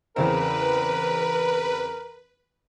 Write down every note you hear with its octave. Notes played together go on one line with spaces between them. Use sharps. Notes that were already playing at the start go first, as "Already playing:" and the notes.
E2 C#3 C4 A#4 B4